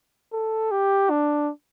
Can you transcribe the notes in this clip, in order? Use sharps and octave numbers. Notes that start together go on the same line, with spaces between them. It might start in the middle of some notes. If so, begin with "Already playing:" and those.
A4
G4
D4